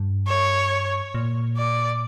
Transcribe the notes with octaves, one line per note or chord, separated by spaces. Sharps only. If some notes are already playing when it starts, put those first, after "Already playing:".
Already playing: G2
C#5
A#2
D5